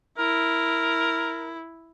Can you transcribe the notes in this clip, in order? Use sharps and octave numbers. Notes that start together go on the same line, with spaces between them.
E4 A#4